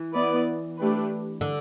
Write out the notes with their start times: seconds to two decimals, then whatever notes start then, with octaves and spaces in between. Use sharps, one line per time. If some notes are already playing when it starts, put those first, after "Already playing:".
Already playing: E3
0.14 B3 E4 B4 D5
0.78 A3 D4 G4 B4
1.41 D3